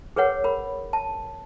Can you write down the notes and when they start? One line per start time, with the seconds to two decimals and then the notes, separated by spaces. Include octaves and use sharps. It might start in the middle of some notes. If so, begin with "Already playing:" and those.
0.16 G#4 A#4 B4 C#5 F#5
0.44 A#4 B5
0.93 A5